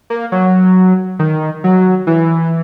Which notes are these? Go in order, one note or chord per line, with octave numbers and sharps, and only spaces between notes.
A#3
F#3
D#3
F#3
E3